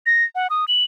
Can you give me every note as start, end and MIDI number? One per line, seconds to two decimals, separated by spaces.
0.06 0.24 94
0.35 0.47 78
0.50 0.65 87
0.68 0.84 102